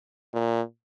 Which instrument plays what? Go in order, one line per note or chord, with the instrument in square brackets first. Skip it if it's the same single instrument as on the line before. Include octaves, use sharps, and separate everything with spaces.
[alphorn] A#2